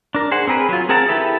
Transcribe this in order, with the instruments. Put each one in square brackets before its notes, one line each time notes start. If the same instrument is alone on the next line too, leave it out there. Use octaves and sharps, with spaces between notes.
[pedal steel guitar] D4 A#4
G#4 C5 F#5
C4 G#4 A#4 B4
F#3 F4
C4 G#4 A#4 F#5 A5
E4 G4 A4 B4 E5